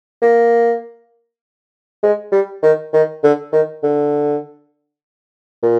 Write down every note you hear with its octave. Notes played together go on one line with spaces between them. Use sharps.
A#3
G#3
G3
D#3
D#3
D3
D#3
D3
A#2